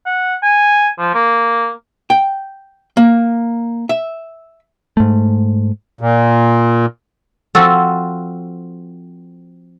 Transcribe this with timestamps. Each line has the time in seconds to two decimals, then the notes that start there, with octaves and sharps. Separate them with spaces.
0.06 F#5
0.43 G#5
0.99 F3
1.14 A#3
2.10 G5
2.97 A#3
3.89 E5
4.97 G#2 A3
6.01 A#2
7.55 F3 C4 F4 F#4 A4